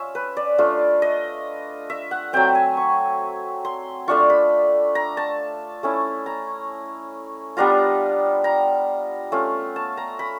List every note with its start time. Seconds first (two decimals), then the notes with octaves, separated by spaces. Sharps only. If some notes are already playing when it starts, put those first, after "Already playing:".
Already playing: C#4 F4 E5
0.15 B4
0.37 D5
0.58 A3 D4 F4
1.02 D#5
1.90 E5
2.11 F#5
2.33 F#3 A3 C4 G5
2.55 G#5
2.77 C#6
3.65 C6
4.08 A3 D4 F4 C#6
4.30 B5
4.95 A#5
5.17 A5
5.83 A3 C#4 E4
6.26 A#5
7.57 G3 B3 D4 F4 A#5
8.44 A#5
9.32 A3 C#4 F4
9.76 A5
9.97 A#5
10.19 B5